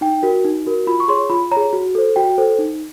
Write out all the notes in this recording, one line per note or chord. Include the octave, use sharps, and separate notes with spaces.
D#4 G5
F#4 A#4
D#4
F#4 A#4
F4 B5
C#6
G#4 C#5 C6
F4 B5
C#5 A#5
G#4
F#4
A4 C5
F#4 G5
A4 C5
D#4